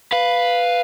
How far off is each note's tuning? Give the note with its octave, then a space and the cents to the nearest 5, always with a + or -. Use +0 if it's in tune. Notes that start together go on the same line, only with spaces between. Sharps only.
B4 +0 F5 +0